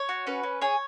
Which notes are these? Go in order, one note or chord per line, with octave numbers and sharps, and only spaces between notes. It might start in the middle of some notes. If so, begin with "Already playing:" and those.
Already playing: C#5
F#4
C#4 B4
C#4
G#4 C#5